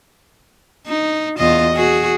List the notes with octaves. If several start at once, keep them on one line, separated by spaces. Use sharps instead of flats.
D#4
E2 F4 D#5
F#4 G#4